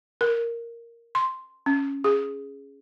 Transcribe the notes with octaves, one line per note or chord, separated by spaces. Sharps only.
A#4
C6
C#4
G#4